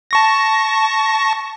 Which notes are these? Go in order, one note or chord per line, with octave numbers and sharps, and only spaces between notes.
A5 C#6 A#6